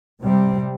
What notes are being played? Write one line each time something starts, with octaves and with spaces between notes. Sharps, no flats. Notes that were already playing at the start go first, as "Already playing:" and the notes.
C3 G3 C4